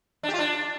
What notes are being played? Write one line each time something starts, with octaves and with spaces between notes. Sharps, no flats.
D4
G4
F4
D4